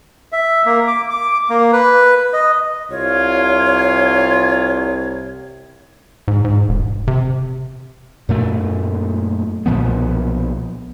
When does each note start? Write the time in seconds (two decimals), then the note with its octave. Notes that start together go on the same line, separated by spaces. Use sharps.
0.32 E5
0.66 A#3
0.87 D6
1.10 D6
1.50 A#3
1.73 B4
2.33 D#5
2.91 C2 F4 C#5
6.28 G#2
6.45 G#2
6.69 E1
7.08 C3
8.29 F#2 A#2 A3
9.66 B1 A#2 F3 B3